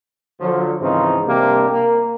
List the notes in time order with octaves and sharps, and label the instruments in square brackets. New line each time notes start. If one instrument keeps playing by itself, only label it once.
[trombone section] D3 F3 F#3
G#2 C#3 E3 F3 C4 D#4
C3 G3 A#3 D4 G4
A#3